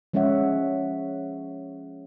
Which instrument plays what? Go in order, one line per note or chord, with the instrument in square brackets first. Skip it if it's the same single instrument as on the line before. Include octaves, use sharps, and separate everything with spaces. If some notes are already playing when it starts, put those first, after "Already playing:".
[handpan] F3 G#3 C#4 C#5 E5 F#5